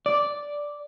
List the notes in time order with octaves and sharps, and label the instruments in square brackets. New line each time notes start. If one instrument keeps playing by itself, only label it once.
[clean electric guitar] D5